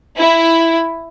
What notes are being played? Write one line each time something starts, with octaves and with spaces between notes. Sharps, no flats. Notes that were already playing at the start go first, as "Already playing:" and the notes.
E4